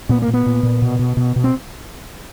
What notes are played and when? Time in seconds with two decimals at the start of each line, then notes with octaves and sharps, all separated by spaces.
0.09 A#2 B3
0.22 A#3
0.28 A#2
0.34 B3
0.46 A#2
0.63 A#2
0.82 B2
0.99 B2
1.17 B2
1.36 B2
1.44 C4